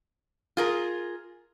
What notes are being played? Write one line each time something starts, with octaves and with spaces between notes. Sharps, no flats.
F4 G#4 A#4